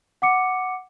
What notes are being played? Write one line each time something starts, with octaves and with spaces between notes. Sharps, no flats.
F#5 D6 C#7